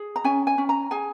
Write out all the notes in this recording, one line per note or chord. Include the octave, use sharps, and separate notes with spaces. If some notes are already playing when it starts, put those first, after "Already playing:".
Already playing: G#4
A#5
C#4 G#5
G#5
C#4
A#5
G#4 G#5